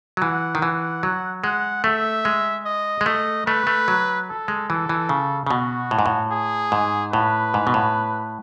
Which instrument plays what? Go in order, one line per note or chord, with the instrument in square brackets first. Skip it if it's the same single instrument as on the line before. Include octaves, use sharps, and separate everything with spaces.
[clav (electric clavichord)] F#3
[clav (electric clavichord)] E3 [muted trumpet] F#5
[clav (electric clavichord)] D#3
[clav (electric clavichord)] E3 [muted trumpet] F#5
[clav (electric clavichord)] F#3
[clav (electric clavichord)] G#3 [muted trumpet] F#5
[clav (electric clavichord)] A3 [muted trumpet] E5
[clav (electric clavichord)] G#3
[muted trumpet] D#5
[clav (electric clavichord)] G#3
[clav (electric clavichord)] A3 [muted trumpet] D#5
[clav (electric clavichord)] A3 [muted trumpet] B4
[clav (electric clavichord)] A3
F#3
[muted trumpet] A4
[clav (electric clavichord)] G#3
[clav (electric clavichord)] E3 [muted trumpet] A4
[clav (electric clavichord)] E3
C#3
C#3
[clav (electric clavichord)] B2 [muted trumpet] F#4
[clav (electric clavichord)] A2
G#2
A2
[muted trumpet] G#4
[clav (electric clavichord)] G#2
[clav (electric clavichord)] A2 [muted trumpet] B4
[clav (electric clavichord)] G#2
B2
A2